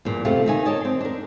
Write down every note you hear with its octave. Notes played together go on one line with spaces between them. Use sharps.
E2 G2 A#2
C3 A3 F4 G4
D#3 D#4 G#5
A#4 C#5 D#5 G#5 A5
C4
D4 A#4